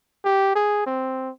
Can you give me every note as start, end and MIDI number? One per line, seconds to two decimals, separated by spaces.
0.24 0.54 67
0.55 0.84 68
0.86 1.31 60